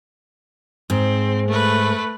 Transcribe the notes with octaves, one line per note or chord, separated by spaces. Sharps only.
G#2 C4
A3 B4